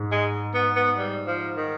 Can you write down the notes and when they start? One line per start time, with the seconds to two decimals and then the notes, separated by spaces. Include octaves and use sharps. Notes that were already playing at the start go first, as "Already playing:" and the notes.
Already playing: G#2
0.12 G#3
0.54 B3
0.76 B3
0.98 G3
1.27 F3
1.56 D#3